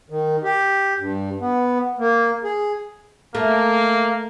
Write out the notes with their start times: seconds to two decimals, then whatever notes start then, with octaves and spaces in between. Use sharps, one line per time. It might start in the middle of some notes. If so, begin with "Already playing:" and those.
0.10 D#3
0.43 G4
0.99 G2
1.40 B3
1.98 A#3
2.44 G#4
3.35 A3 A#3